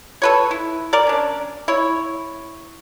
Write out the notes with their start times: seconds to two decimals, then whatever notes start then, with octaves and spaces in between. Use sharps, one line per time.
0.22 A4 B4 C#5
0.51 E4
0.93 A#4 D5
1.07 C#4 D4
1.68 E4 C#5